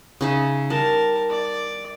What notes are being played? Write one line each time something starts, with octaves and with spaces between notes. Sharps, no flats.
C#3 D#4 E5
G3 A#4 A5
D5